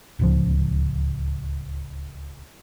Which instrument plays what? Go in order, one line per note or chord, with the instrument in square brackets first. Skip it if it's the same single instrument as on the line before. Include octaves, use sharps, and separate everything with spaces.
[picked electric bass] D1 C#2 F3